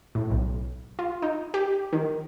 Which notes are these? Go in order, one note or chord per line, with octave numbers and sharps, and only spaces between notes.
A2
B1
F4
D#4
G4
D#3